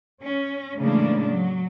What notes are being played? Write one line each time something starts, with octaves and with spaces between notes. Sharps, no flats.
C#4
A2 C#3 E3 G#3 A#3 D4
F#3